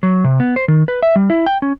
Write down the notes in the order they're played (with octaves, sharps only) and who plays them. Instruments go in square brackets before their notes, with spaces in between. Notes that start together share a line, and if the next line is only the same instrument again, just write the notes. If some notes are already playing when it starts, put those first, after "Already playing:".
[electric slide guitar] F#3
C3
B3
C5
D#3
B4
E5
G3
E4
G5
C#4